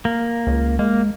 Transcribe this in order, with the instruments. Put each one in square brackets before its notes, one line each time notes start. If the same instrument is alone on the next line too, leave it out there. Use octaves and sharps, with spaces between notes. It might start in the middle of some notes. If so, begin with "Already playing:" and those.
[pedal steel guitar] A#3
[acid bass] C#2
[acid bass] G#3 [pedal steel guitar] A#3